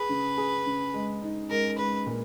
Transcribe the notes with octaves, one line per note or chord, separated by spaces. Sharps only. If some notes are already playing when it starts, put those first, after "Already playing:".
Already playing: G#4 B4
C#3
G#4
C#3
G#3
D#4
G#3 A#4
G#3 B4
A#2